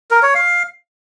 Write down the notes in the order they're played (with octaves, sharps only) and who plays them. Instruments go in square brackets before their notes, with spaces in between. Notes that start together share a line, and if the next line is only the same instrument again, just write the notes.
[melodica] A#4
C#5
F5